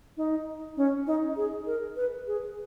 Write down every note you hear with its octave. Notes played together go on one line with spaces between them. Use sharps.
D#4
C#4
D#4
G#4
A#4
B4
G#4